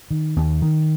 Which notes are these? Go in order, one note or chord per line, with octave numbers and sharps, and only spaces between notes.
D#3
D#2
D#3